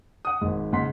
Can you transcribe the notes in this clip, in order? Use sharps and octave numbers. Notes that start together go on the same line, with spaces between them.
F#5 D#6
G#1 G#2
G#2 C#3 F#5 C6 B6